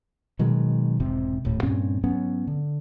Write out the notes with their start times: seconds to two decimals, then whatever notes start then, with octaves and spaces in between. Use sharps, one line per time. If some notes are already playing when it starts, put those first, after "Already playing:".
0.39 B2 D#3 F#3 G#3
1.00 E1 G#2 C3 C4
1.45 D#1 A2
1.63 G2 A#2 C4 C#4
2.03 G#2 F#3 B3 C#4
2.47 D3